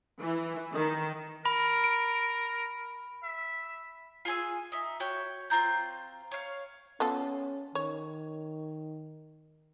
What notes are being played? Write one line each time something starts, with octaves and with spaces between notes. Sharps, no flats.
E3
D#3
A#4 B5
D7
E5
F4 G#4 G#5 E6
D#4 E5
F#4 C#5 G5
C4 F4 A#5 G6
C#5 F5
B3 C#4 F4 A4
D#3 C#5